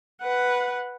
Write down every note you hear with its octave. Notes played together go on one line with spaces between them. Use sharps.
B4 F#5